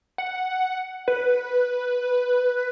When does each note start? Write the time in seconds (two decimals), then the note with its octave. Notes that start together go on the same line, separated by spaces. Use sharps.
0.18 F#5
1.08 B4